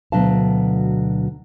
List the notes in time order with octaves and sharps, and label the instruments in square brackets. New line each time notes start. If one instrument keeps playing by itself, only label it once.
[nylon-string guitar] D2 B2 F#3 D4 F5 A5